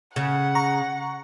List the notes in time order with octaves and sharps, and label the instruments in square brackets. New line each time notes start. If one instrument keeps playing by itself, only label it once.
[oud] C#3 [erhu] F#5
[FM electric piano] A#5 C#6